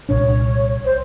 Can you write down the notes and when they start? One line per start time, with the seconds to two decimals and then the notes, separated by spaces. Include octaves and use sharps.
0.09 C2 A#2 D4 C#5
0.85 C5